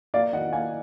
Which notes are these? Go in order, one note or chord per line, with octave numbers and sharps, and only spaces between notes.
A#3 D5 F5
D#3 D#5 F#5
A#3 F5 G#5